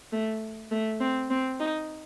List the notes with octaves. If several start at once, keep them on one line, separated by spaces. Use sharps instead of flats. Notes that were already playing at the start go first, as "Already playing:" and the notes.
A3
A3
C4
C4
D#4